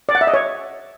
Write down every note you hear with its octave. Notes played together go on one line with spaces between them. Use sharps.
D5
F#5
E5
D#5
C#5